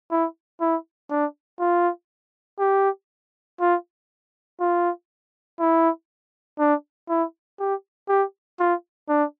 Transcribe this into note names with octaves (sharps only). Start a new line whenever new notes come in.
E4
E4
D4
F4
G4
F4
F4
E4
D4
E4
G4
G4
F4
D4